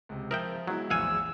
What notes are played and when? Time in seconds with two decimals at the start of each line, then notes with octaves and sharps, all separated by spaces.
0.09 C#2 C3
0.31 F3 A#4 E5 G5 D#6 F#7
0.67 F#3 G#3 B3 E4
0.90 A#1 E2 A2 F5 F#5 G#5 E6